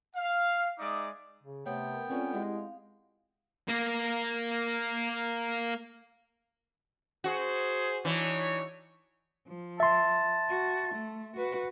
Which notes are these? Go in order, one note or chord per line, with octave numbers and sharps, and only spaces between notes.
F5
G#3 D#4 D5 E5 D6 D#6
C#3
C3 A3 B3 C#5 G5
A#4 B4
C4 C#4 F4 A4 B4 D5 C#6
G#3 E4 G4 E5 F#5
F5
A#3 A#4
F#4 G#4 C5
E3 D4 D#4 C#5
F3
E5 A5 C6
F#4
A3
F#4 B4